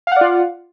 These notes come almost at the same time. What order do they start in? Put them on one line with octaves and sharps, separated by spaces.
F5 F#5 D5 F4